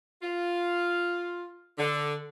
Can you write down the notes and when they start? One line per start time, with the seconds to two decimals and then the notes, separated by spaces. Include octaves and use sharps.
0.22 F4
1.78 D3